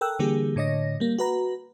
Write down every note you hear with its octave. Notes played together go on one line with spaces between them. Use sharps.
A4 A#4 G5 E6 F#6
D3 E3 G3 A#3 G4 G#4
A2 D3 C#5 D#5 A#6
G3 A#3
F#4 B4 A#5